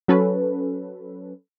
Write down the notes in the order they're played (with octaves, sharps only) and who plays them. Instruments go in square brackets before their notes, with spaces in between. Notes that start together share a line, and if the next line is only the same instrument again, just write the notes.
[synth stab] F#3 C#4 A4 B4